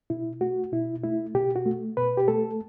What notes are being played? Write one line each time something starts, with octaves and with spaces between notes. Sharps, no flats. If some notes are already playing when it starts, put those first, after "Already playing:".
B2 E4
A3 F#4
B2 E4
A3 E4
B2 G4
F#4
A3
B2 B4
G4
A3 A4